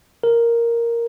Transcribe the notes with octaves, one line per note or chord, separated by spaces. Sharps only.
A#4